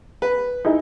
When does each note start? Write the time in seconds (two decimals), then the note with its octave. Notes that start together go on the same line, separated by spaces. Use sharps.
0.22 B4
0.65 D#4 E4 G#4